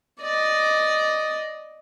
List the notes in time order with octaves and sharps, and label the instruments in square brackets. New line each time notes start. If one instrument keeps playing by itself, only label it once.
[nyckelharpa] D5 D#5